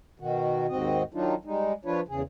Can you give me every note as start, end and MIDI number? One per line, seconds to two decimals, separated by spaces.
0.20 0.67 47
0.20 0.67 51
0.20 0.67 66
0.69 1.03 39
0.69 1.03 44
0.69 1.03 60
0.69 1.03 66
0.69 1.03 75
1.14 1.35 51
1.14 1.35 54
1.14 1.35 62
1.14 1.35 63
1.14 1.35 65
1.45 1.73 55
1.45 1.73 56
1.45 1.73 63
1.85 2.01 53
1.85 2.01 62
1.85 2.01 65
1.85 2.01 71
1.85 2.01 73
2.08 2.22 40
2.08 2.22 49
2.08 2.22 68